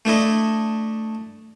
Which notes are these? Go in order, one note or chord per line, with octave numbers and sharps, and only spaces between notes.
A3 D4 E4 D#5